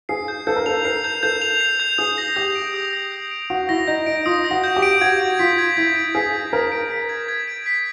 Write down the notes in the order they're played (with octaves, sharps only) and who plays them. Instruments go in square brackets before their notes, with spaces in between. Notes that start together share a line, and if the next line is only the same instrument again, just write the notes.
[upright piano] G#4 [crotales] C7
[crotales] G6
[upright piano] A4 [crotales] G6
[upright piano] A#4
[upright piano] A4 [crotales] F7
[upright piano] A#4 [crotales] C7
[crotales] G6
[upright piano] A4 [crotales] G6
[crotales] F7
C7
G6
[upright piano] G#4 [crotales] D#6
[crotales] A#6
[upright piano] G4 [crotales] G6
[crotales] D7
D#6
A#6
G6
D7
[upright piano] F#4 [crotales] D#6
[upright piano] E4 [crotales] A#6
[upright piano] D#4 [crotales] G6
[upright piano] D#4 [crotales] D7
[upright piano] F4 [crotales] D#6
[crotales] A#6
[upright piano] F#4
[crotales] G6
[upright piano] G4
[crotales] D7
[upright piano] F#4 [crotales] G#6
[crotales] D7
[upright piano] F4 [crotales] B6
[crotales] G#6
[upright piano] E4 [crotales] G#6
[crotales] D7
[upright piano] G#4 [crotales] B6
[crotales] G#6
[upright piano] A#4 [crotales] G#6
[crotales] D7
B6
G#6
G#6
D7
B6